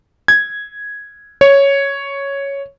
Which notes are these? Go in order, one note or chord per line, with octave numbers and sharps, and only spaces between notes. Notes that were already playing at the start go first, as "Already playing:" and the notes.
G#6
C#5